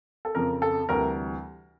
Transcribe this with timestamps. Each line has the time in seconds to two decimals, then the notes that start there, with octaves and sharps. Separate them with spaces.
0.25 A4
0.35 F2 C#3 F3 A#4
0.62 A4
0.89 D2 C3 E3 G3 A#4